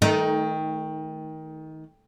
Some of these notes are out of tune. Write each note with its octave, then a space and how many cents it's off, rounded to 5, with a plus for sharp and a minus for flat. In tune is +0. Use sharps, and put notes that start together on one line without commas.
D#3 +20 A3 -20 D#4 +0